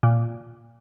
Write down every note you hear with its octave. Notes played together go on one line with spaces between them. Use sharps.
A#2